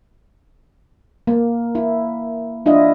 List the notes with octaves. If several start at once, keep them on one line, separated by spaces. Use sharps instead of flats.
A#3
E4
D4 E4 F4 D#5